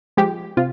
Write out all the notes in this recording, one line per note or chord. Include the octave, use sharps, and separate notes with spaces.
F3 G#3 G4
C3 F4